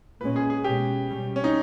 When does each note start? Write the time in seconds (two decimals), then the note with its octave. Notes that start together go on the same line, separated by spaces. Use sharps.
0.21 A#2 G#3 C#4 B4
0.36 G#4
0.50 G#4
0.64 B2 G#3 C#4 G4
1.09 B2 G3 C#4
1.36 C#4
1.44 D#4